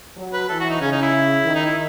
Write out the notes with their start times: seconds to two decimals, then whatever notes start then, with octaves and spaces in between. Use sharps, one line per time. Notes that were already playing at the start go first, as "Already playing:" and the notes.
0.17 F#3
0.33 B4
0.49 E3 A4
0.60 F#4
0.70 D#4
0.81 C#3 C#4
0.92 D#4
1.02 E4
1.44 D#3
1.55 D#4
1.66 E4